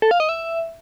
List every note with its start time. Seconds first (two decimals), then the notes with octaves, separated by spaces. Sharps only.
0.02 A4
0.11 F5
0.20 D#5
0.29 E5